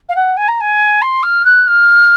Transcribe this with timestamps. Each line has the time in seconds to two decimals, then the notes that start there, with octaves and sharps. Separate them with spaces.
0.09 F5
0.16 F#5
0.37 G#5
0.48 A#5
0.60 G#5
1.02 C6
1.23 F6
1.45 F#6
1.67 F6